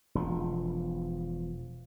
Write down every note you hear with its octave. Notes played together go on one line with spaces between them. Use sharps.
E1 F3